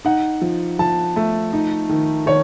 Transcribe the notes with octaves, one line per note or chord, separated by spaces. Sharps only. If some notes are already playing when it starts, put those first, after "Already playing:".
D#4 F#5
F3
F3 A5
A3
D#4
D#3
D#3 C#5